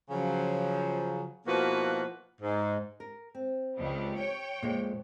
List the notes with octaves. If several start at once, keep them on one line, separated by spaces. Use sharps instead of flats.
C#3 F3 F#3
B2 F3 A#3 E4 F#4 B4
G#2
A#4
C4
C#2 G3
C#5 G5
F2 A#2 G#3 B3